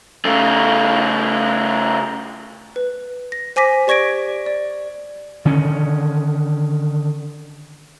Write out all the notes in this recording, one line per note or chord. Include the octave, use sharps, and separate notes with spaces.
C#3 A3
B4
A#6
C5 G#5 D6 A#6 B6
G4 D5 C#6 G#6 A#6 D7
D5
D3 D#3 C#4